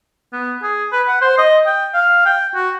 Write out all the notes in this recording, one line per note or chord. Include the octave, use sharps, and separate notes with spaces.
B3
G#4
B4
F#5
C5
D#5
G5
F5
G5
F#4